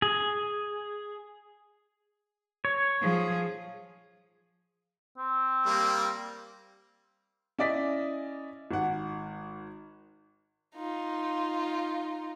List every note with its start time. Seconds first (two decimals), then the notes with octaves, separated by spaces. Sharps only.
0.02 G#4
2.65 C#5
3.02 F3 G#4
5.18 C4
5.66 G3 A#3
7.59 C#4 E4 D5 D#5 B6
8.71 G#1 F#5
10.75 D#4 F4